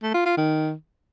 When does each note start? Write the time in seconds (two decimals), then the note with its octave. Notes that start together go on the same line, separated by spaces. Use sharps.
0.03 A3
0.14 F4
0.26 F4
0.37 D#3